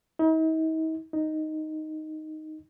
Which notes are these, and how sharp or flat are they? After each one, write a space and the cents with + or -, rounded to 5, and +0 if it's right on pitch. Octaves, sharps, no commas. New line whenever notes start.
D#4 +45
D#4 +0